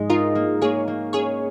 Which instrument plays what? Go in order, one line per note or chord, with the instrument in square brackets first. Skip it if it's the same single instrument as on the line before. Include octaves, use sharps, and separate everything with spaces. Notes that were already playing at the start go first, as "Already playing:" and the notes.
Already playing: [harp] G#2 G#3
[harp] D#4 [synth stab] F4 A#4
[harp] A#3
[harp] A#3 [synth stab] G#4 C#5
[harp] A#3
[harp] C#4 [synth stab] G#4 C#5